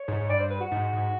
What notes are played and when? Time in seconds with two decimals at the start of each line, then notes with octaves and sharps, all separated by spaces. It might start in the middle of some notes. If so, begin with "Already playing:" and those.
Already playing: C#5
0.08 G#2
0.21 G#2
0.29 G2 D5
0.39 C5
0.50 B4
0.60 F#4
0.71 G#2
0.93 G#2